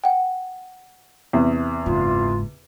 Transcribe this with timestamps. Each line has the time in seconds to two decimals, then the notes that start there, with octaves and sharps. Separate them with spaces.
0.04 F#5 G5
1.33 E2 C3
1.86 F#1 G#2 F4